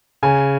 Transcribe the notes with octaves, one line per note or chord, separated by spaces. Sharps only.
C#3 G#5